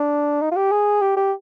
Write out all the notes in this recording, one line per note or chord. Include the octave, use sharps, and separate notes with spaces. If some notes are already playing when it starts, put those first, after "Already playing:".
Already playing: D4
D#4
F4
G4
G#4
G4
G4